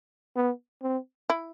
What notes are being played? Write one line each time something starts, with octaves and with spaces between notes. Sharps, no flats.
B3
C4
E4